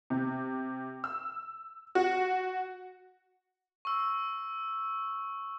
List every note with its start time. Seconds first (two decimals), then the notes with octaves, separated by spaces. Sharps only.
0.10 C3
1.04 E6
1.95 F#4
3.85 C#6 E6